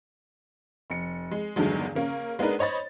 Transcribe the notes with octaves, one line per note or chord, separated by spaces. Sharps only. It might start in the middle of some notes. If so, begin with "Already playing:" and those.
F1 C#7
G#3
E2 G2 D3 D#3 F#3 G#3
C#3 A#3 C#4
G#3 B3 D4 D#4 A#4 B4
C5 C#5 D#5 B5 A6